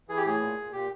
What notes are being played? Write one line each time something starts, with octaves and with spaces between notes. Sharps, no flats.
E3 G#4
G4
A2 G#4
A#2
A#2
A#2 G4